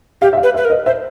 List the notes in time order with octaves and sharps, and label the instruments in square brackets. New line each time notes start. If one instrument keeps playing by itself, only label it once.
[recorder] G4 [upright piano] F5
[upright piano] E5
F5
[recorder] B4
[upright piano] E5
[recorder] B4
A#4
[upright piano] D#5
[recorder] C5 [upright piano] E5